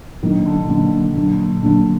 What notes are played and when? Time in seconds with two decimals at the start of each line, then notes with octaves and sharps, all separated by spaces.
0.23 A#2 D#3 F#3 A#3 D4
0.46 D3
0.70 A#2 D3 F#3 A#3 D4
1.16 A#2 F#3 A#3 D4
1.63 A#2 D3 F#3 A#3 D4